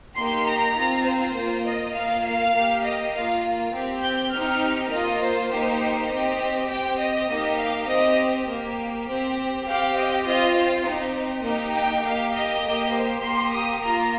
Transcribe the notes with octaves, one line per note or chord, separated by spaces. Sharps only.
A#3 D#4 G4 C6
A#5
C4 F4
C5
A#3 F4
D#5
A#3 F4 F5
F5
A#3 G4
D#5
A#3 F4 F5
C4 G4
G6
C4 D#4 G4 F6
A#3 F4 D#5
C5
A#3 D#4 G4
C4 G4 D#5
C4 G4 G5
D#5
A#3 D#4 G4
F5
C4 G4 D#5
A#3 G4
C4 G4
C4 G4 F5
D#5
C4 F4 D#5
C5
C4 D#4 G4
A#3 D#4 G4
G5
A#3 G4 F5
D#5
A#3 G4
C5
A#3 G4 C6
D#6
A#3 F4 A#5